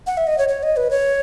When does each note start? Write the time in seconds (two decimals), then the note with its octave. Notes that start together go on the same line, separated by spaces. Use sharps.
0.07 F#5
0.17 E5
0.27 D#5
0.38 C#5
0.49 C#5
0.63 D#5
0.77 B4
0.91 C#5